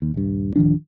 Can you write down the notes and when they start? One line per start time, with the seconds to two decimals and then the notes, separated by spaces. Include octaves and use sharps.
0.02 D#2
0.14 D#1 G2
0.56 D1 D#3 F3 D4